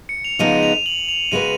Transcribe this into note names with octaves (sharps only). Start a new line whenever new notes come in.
C#7
F7
C#3 F3 G#3 B3 D#4 D#7
F7
F#7
F7
C#3 G#3 B3 F#4 B4 D#7